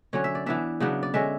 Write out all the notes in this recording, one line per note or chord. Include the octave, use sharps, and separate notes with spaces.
D3 F#3 C#4 C#5
E5
D5
E3 B3 D4 E5
C#3 F#3 B3 D4
D5
D3 G#3 C#4 E5